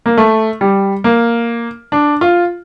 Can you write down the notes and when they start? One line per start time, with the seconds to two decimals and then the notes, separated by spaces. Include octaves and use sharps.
0.06 A#3
0.17 A3
0.61 G3
1.04 A#3
1.92 D4
2.21 F4